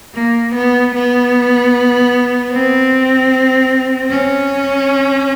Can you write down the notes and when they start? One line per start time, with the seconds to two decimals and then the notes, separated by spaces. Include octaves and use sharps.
0.15 A#3
0.55 B3
0.94 B3
2.52 C4
4.10 C#4